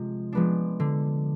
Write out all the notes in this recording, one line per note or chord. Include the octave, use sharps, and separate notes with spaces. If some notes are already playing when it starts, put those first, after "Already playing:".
Already playing: C3 F3 G#3
F3 G#3 B3 D4
D3